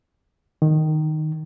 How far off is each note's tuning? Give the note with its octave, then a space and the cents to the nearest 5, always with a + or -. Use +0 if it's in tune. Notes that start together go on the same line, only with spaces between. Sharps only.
D#3 -5